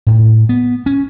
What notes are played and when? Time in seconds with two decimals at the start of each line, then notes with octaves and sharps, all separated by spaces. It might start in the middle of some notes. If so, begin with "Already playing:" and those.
0.07 A2
0.49 B3
0.86 C#4